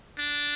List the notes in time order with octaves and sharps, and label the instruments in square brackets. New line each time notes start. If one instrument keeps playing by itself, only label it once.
[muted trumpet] D4